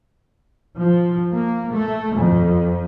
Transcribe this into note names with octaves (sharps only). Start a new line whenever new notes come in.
F3
A#3
A3
F2